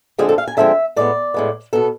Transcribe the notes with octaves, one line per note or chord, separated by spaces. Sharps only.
D3 F3 G#3 C4 G#4
A4
F5
G#5
D3 F3 G#3 C4 E5
A2 G#3 B3 D5
A2 G#3 B3
B2 B3 A4